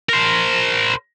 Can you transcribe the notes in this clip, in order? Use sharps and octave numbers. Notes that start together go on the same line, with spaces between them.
A#4 C5